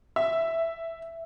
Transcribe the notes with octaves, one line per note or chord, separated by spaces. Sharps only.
E5